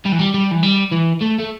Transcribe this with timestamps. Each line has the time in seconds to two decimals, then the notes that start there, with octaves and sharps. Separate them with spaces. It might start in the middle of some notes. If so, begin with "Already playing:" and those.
0.06 G3
0.12 E3
0.19 G3
0.34 G3
0.51 E3
0.63 G3
0.91 E3
1.21 A3
1.39 A3